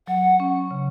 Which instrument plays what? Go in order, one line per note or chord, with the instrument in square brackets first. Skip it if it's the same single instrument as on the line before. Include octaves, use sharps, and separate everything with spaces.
[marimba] F#3 [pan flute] F#5
[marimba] C#4
C#3